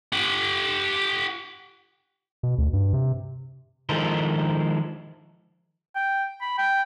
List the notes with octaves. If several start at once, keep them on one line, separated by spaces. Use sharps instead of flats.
G4 F#5
B2
D2
G2
C3
D#3 F3 G#3 A4 A#4 C5
G5
B5
G5